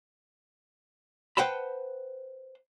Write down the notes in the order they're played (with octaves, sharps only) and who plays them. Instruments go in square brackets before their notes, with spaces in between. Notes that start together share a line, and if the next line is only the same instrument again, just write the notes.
[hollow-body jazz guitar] B4 C5 F#5 G5 A5 B5